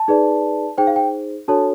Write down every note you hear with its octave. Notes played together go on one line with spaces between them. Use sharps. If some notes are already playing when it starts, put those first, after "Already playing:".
Already playing: A5
D#4 G#4 B4 D5
D#4 G#4 C5 G5
F5
G5
D4 F#4 A4 C#5 A5